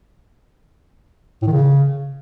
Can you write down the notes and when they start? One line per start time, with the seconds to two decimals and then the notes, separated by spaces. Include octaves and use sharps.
1.42 A2
1.47 D#3
1.52 C#3